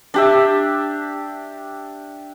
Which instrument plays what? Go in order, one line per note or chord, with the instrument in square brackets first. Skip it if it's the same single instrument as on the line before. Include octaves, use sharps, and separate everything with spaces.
[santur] D4 G4 E5